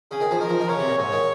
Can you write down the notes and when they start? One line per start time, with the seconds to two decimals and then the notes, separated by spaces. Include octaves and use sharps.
0.11 C#3 G#4
0.21 D#3
0.31 F3
0.40 D#3 A#4
0.49 F3
0.60 D#3
0.69 C#3 C#5
0.79 C3
0.88 A#2
0.98 G#2 C#5
1.12 D#3